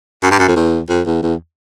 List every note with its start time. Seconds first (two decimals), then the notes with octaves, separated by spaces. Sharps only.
0.23 F#2
0.31 G2
0.39 F#2
0.48 F2
0.56 E2
0.89 F2
1.06 E2
1.23 E2